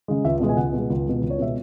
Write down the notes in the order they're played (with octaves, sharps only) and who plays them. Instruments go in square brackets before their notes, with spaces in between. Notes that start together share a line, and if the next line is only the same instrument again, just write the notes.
[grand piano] C#3 G#3
C#2 E5
B2 G#3
G#5
C#2 F#5
B2 G#3
C#2
B2 G#3
C#2
C#5
B2 G#3 E5